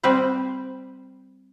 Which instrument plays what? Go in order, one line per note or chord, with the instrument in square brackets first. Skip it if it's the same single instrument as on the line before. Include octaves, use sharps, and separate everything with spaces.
[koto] G3 C4 B4 C5